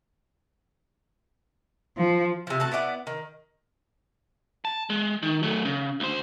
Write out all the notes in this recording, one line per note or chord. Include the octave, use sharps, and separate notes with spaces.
F3
C3 F3
A3 F#4 A5
B3 E4 D5 F#5
D#3
A5
G#3
D#3
F#3 A3
C#3
D2 C5